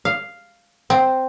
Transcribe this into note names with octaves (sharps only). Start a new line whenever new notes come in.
F5
C4